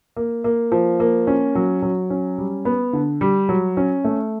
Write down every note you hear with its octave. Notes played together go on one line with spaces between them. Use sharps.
A#3
A#3
F3
A#3
C#4
F#3
F#3
C#4
G3
B3
D3
G3
F#3
C#4
A3